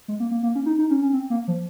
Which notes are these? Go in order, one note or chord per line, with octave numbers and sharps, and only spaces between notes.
G#3
A#3
A#3
A#3
C#4
D#4
D#4
C#4
C#4
C4
A#3
F3